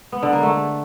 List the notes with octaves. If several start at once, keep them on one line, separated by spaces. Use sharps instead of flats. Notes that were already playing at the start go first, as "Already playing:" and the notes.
B3
D3
A#3
A3